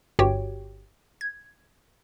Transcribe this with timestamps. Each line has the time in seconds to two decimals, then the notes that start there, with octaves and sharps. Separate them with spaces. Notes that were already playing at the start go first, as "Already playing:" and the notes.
0.19 G1 G2 F#4 G4 C#5 G5
1.21 G#6